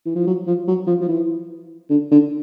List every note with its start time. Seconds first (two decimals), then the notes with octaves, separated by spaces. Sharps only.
0.05 E3
0.15 F3
0.26 F#3
0.47 F3
0.67 F#3
0.87 F3
1.01 F3
1.08 E3
1.90 D3
2.11 D3